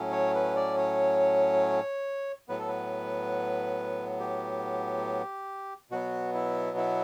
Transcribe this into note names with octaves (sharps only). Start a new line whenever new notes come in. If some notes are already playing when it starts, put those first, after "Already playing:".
Already playing: A2 F#3 C#4
C#5
B4
D5
C#5
A2 F#3 B3 B4
A4
B4
G4
B2 F#3 B3 F#4
E4
E4